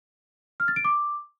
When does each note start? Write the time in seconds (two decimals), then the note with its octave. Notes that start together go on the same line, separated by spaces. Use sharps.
0.60 F6
0.68 A6
0.76 D7
0.85 D6